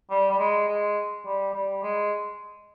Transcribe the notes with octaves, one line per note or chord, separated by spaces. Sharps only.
G3
G3
G#3
G#3
G3
G3
G#3